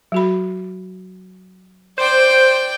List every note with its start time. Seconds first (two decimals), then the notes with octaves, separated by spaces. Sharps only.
0.12 F#3 F#4 B5
1.98 C5 D5 G5